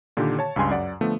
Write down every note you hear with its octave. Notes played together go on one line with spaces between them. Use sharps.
A#2 D3 D#3 G4
C#5 A5
C#2 G2 C#3 G#5 C6
F#2 D5 F#5
D3 F3 A3 B3